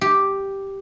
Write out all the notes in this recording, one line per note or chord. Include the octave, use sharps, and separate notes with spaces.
G4